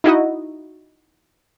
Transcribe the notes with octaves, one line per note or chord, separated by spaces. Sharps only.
D#4 E4 F#4 D#5